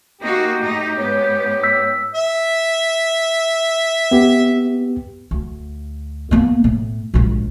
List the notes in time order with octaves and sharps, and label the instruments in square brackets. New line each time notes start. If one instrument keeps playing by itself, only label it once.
[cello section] A#3 D#4 F#4 [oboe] G4
[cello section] A2 D#4
[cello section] G#2 B3 [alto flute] C#5
[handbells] E6 B6
[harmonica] E5
[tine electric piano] B3 G4
[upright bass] D2
A#3 B3
A2
A#1 G#2